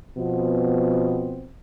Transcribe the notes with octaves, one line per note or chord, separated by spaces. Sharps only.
B2 F3 B3 C4